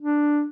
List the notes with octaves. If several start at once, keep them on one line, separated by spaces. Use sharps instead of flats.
D4